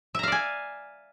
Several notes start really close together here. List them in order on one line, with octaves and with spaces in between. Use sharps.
E5 A#5 F5 D5 G#5